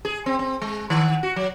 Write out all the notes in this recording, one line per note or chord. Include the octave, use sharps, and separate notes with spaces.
G#4
C4
C4
G#3
D#3
F#4
F#3